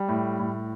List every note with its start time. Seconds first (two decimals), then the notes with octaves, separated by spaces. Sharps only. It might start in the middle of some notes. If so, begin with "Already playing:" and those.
Already playing: G3
0.08 A2
0.39 A2